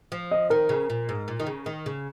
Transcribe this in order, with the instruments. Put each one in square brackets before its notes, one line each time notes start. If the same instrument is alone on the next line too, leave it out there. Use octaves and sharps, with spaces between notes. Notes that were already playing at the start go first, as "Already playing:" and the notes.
[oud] F3
[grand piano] D#5
[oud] D#3 [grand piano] A#4
[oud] C#3
A#2
G#2
A#2
D#3
C#3
D#3
C#3